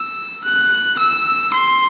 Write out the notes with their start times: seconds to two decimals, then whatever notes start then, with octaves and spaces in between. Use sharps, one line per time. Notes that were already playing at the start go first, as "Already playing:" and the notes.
Already playing: E6
0.44 F#6
0.99 E6
1.53 C6